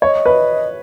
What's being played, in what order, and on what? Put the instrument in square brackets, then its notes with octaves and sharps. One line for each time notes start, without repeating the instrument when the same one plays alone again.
[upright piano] C#5 [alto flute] D#5
[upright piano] B4